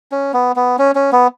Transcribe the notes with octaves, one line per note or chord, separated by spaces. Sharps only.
C#4
B3
B3
C#4
C#4
B3